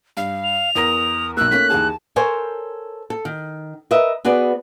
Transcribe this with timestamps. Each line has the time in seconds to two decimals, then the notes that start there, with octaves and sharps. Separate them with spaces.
0.17 G2 F5
0.44 F7
0.75 E2 A#4 D#6 A#6
1.37 B1 A#3 E6 F#6
1.51 A3 A#3 C#4 B6
1.70 D#2 E3 G#4 A5
2.16 A4 A#4 C5 C#5 G#5
3.10 A4
3.25 D#3
3.91 A#4 B4 D#5 E5
4.25 B3 F#4 G#4 B4 D5